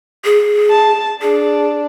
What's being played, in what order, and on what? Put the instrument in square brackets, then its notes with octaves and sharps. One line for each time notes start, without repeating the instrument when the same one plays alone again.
[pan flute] G#4
[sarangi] A5
[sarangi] D4 [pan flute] G#4